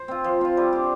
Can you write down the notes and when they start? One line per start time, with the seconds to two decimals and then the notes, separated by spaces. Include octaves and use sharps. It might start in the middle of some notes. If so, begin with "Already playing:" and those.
Already playing: C5
0.08 C4 F4
0.24 F3
0.41 C4 F4
0.57 G3
0.73 D4 G4